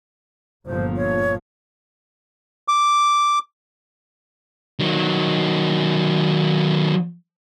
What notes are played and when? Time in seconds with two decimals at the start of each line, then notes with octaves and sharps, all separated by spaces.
0.66 G1 A#2 F3 C5
0.97 C#5
2.68 D6
4.80 D#3 F#3